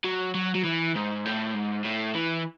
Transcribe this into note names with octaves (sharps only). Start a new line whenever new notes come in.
F#3
F#3
F#3
E3
G#2
A2
G#2
A2
E3